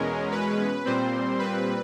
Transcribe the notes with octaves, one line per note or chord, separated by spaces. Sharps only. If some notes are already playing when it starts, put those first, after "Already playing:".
Already playing: E2 B2 G#3 C#4 A#4
B4
A#2 G3 C4 C5
B4